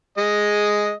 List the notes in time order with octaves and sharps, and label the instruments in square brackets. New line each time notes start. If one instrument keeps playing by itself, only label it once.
[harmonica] G#3 D#5